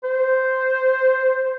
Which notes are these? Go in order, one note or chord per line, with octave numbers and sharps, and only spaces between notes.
C5